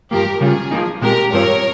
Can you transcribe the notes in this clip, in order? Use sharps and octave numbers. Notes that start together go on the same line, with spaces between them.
G2 F3 A#3 G4 A#4
C#3 G3 C#4 F4 G#4
F3 A#3 D#4
A#2 G#3 C4 G4 A#4
G2 F3 C4 A#4 C#5